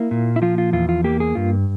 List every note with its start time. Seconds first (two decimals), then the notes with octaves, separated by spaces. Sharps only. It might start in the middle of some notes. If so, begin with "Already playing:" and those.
Already playing: A#3 E4
0.11 A#2
0.36 E4
0.42 F3 F4
0.58 F4
0.73 E2 F4
0.89 F4
1.04 A#3 G4
1.20 G#4
1.35 G2 F4